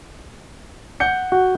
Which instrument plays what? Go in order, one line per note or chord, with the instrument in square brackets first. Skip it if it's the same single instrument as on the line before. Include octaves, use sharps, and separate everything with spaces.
[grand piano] F#5 G6 C#7
[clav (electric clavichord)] F#4